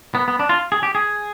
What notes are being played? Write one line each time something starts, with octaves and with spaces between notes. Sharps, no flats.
B3
B3
D4
F4
G#4
G4
G#4